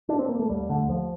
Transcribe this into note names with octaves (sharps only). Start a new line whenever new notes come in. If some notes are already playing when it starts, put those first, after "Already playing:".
D4
C4
A#3
A3
D#2 G3
D3 A3
D#2 F3